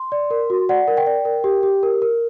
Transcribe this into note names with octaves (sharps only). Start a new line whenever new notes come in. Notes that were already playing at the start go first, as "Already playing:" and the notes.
Already playing: C6
D5
A#4
F#4
D5 F#5
A#4
G5
D5
A#4
G4
G4
A#4
A#4